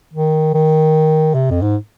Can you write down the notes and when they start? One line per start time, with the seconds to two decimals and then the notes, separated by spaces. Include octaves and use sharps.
0.14 D#3
0.54 D#3
1.34 C3
1.50 F2
1.62 G#2